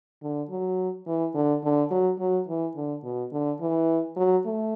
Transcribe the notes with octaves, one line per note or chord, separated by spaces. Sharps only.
D3
F#3
E3
D3
D3
F#3
F#3
E3
D3
B2
D3
E3
F#3
A3